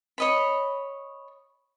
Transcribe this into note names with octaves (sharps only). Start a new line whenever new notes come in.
C#5 D#5 B5